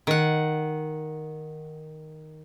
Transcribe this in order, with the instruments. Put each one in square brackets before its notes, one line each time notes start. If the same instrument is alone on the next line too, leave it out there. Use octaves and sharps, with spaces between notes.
[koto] D#3 F#5